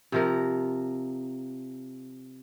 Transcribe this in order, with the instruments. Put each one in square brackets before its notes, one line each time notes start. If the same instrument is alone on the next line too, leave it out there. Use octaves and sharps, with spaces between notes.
[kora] C3 F3 A#4